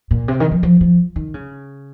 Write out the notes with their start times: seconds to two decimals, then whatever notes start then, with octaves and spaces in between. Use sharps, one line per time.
0.11 A#2
0.28 C3
0.40 D#3
0.51 F3
0.63 F3
0.81 F3
1.16 D#3
1.34 C#3